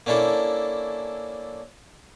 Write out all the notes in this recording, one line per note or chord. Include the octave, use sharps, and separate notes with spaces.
A#3 C#4 D4 E4 A4